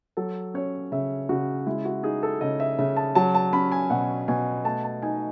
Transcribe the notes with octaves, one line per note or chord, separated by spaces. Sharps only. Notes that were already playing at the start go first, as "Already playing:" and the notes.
F#3 A4
C#4 C#5
C#3 E5
C#3 F#4
G#3 E4
F#4
D#4 G#4
A4
C#3 D#5
E5
C#3 E5
A5
F#3 A5
A5
C#4 B5
G#5
B2 F#5
B2 G#5
A3 A5
A5
D#4 G#5